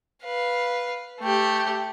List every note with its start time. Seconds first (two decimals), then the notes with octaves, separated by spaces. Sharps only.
0.24 B4 F5
1.20 A3 G4